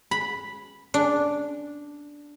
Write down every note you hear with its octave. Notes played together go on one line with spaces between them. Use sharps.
B5
D4